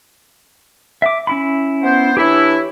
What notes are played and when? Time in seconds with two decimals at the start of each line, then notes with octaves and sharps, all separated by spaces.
1.02 E5 D6
1.27 C#4 E4 B5
1.83 B3 C5
2.17 E3 D4 E4 G4 C#5